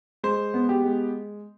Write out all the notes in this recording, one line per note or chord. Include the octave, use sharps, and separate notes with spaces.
G#3 C5
B3
G4
G#3